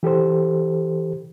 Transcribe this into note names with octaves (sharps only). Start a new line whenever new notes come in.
E3 G4 A4 C5